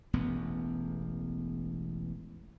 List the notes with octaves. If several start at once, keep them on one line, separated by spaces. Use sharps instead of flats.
E1 A1 E2 B3